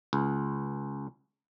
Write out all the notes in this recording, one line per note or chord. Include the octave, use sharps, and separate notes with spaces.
C#2